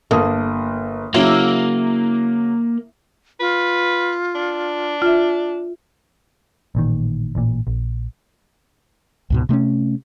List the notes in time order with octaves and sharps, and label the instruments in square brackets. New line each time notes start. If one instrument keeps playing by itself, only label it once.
[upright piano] G1 A5 D#6 [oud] A#3
[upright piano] C#3 F#3 [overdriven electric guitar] A#3 [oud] E4
[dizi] F4 [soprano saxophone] B4
[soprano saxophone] D4
[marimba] F4 E5
[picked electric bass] A1 A#2 D#3
A1 A#2
A#1
[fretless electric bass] C#2 G#2 B2
C3 A3 C4 C#4